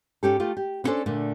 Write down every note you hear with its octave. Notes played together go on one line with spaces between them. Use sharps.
G#2 C#4 G4 A4
A3 F4 G4
G4
B3 C#4 D4 E4 A4 C5
A#2 D3 A3